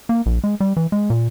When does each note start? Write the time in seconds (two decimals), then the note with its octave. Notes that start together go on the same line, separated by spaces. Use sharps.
0.09 A#3
0.26 A#1
0.44 G#3
0.60 G3
0.77 E3
0.92 G#3
1.10 A#2